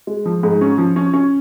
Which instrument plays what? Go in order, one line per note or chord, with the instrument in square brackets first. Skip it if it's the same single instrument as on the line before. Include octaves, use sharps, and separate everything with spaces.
[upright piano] G#3
F3
G#2
C#4
F3
C#4
C#4